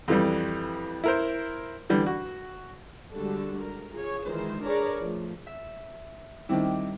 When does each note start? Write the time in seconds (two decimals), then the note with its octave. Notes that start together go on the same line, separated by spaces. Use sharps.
0.08 F2 E3 G3
1.04 E4 A#4 C5
1.90 D3 E3 G3
2.06 F#4
3.13 D3 G3 G#3 D4 F#4 A4
3.61 A#4
3.93 F4 G#4 C#5
4.25 D#3 E3 G#3 C5
4.62 D4 G#4 A#4 B4 C#5 D5
5.03 F3 A3
5.47 E5
6.49 D#3 G3 C4 D4 E4